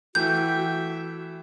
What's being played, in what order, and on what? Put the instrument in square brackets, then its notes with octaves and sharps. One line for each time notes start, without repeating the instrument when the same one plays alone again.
[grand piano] E3 A3 [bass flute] F#4 [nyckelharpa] E5 G5 [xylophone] G6